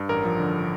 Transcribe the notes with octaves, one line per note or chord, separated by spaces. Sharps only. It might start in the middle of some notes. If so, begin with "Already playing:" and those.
Already playing: G2
A1 A#4
F3
D3